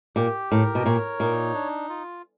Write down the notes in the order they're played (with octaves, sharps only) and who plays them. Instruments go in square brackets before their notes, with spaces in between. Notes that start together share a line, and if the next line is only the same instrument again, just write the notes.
[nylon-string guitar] A#2 [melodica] G4
[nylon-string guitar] A2 [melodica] A#4
[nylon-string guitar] B2
[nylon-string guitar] A#2 [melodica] C#5
[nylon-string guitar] A#2 [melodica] D#4
[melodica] D4
F4